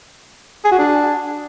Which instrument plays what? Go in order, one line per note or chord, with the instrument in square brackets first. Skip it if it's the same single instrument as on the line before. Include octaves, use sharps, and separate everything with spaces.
[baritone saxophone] G#4
F#4
D4